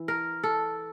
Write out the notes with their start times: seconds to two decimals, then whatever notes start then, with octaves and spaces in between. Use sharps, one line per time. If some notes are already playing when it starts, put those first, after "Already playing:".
Already playing: E3
0.08 A#4
0.43 A4